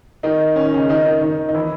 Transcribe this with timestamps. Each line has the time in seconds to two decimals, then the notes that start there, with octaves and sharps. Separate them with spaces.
0.23 D#3 D#4
0.56 C#4
0.65 D#4
0.74 C#3 C#4
0.89 D#3 D#4
1.05 D#3 D#4
1.22 D#3 D#4
1.49 D#4
1.54 E3 E4